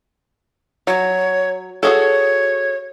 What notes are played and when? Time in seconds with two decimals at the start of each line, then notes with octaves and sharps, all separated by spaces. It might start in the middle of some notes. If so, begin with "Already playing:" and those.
0.87 F#3 C#5
1.83 F#4 G#4 A4 C#5